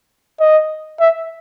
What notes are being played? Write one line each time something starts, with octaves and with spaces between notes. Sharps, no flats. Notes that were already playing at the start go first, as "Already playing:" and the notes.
D#5
E5